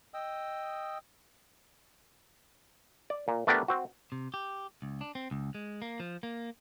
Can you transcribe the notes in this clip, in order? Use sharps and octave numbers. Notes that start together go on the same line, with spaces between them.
D#5 G5 D#6 E6
D5
A#2
A3 B3 D4 G4 A#4 D5
C4 F#4
C3
G4
C#2
D4
C4
C#2
G#3
A#3
F3
A#3